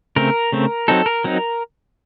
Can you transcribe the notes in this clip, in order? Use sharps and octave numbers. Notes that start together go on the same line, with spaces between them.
C#3 A3 C4 A#4
C#3 A3 C4
F#3 C4 D#4 A4
A#4
F#3 C4 D#4